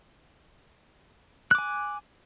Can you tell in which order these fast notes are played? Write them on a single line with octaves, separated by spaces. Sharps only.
F#6 D6 G#5